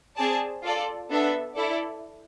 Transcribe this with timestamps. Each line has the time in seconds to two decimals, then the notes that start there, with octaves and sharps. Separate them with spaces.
0.16 C4 G#4 D5 A5
0.63 F4 A4 D5
1.10 B3 D4 A4 E5
1.57 E4 A4 D5